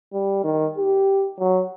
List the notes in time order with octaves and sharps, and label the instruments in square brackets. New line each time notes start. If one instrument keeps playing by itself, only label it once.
[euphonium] G3
D#3
G4
F#3